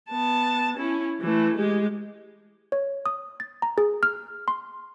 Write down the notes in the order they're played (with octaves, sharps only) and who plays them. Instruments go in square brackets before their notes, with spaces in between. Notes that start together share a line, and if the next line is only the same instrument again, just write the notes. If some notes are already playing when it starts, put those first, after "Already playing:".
[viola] B3 A5
C#4 E4
E3 A3
G#3 G4
[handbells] C#5
D#6
A6
A#5
G#4
F6
C6